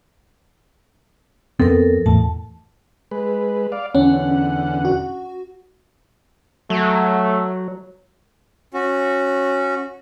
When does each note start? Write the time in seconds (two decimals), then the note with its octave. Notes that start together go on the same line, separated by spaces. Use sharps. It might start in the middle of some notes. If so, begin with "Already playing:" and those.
1.60 F2 B3 C4 A4 A#4
2.06 E2 A2 A5
3.11 G#3 B4
3.72 D5 F5
3.95 E2 D3 C#4 F#5
4.85 F#4
6.70 F#3 A3
8.74 C#4 F#4